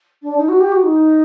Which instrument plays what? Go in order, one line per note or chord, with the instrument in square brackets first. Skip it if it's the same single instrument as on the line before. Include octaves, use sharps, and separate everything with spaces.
[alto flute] D4
D#4
F#4
G4
F#4
D#4